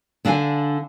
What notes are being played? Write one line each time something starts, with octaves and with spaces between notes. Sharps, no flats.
D3 D4 F5 G5 G#5